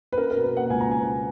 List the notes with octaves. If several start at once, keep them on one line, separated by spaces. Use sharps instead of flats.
B4
C#4 A#4
A#4
B2
B4
A#3 F#5
C#2 G#5
A#5
C#4 G#5
B2